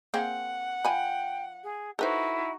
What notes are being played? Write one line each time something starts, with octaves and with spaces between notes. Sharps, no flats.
A#3 C4 G#4 F#5
F3 G5 G#5 B5
G#4
D#4 E4 F#4 A4 B4 C5